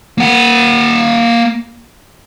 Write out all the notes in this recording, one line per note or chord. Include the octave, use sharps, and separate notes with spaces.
A#3 F#5